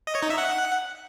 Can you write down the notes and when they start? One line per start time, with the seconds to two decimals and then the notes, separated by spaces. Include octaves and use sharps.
0.07 D#5
0.15 C#5
0.23 D#4
0.30 E5
0.38 F#5